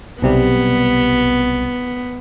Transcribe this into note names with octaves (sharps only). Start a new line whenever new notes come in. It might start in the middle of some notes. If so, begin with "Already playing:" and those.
B1 C3 G3 B3